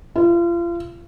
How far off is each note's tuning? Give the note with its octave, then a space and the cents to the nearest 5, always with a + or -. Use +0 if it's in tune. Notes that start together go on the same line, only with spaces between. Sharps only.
F4 -35